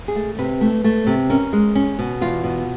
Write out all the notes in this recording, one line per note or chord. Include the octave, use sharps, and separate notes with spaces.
G#4
A3
C3 B4
A3
A3
C3
C#4 A#4
G#3
C#4
B2
E2 F4
B2